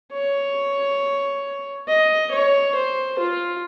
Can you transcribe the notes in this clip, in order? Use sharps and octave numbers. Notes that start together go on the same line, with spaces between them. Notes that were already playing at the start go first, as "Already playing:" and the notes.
C#5
D#5
C#5
C5
F4